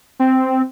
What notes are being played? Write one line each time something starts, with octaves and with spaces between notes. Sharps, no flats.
C4